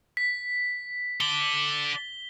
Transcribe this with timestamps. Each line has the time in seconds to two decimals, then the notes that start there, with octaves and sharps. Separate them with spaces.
0.17 B6
1.20 A4 D5 G7